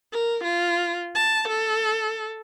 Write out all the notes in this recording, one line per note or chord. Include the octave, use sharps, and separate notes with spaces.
A#4
F4
A5
A4